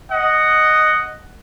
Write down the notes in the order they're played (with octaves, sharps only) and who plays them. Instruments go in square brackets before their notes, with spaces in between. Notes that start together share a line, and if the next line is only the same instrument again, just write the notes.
[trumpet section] D#5 F#5